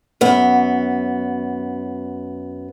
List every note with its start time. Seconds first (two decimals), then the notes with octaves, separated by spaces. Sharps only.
0.21 F#2 B3